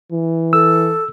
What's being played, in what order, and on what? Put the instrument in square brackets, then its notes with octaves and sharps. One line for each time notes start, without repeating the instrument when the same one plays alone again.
[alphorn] E3
[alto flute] A4 [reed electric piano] E6